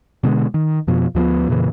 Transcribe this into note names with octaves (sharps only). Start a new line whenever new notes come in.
B2 D3 G#3
D#3
F2 B2 F3
D2 F3 A#3 B3
F2 A#2 C#3 E3